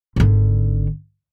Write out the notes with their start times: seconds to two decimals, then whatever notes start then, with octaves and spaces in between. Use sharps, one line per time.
0.16 G#1 D3